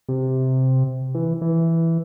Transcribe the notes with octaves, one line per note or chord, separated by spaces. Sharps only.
C3
E3
E3